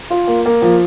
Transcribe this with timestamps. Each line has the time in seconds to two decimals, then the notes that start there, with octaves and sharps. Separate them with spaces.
0.10 F4
0.27 A#3
0.46 A#3
0.62 F3